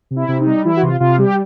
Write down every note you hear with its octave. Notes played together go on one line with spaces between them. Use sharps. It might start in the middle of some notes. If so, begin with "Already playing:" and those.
C3
E4
C3
D#4
G3
E3 E4
F#4
C3 F4
C3 F4
G3 G4